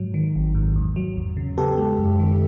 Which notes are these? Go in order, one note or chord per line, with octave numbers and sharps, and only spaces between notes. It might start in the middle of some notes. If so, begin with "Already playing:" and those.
Already playing: G#2 F#3
D#3
G#1
G#2
E2
F#3
E2
C#3
B3 G4 A4
G#3
F#2
D#3